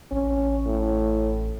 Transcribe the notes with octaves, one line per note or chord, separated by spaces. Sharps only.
A1 C#4
A2